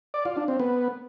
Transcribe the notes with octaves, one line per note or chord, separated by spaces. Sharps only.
D5
F4
D4
C4
B3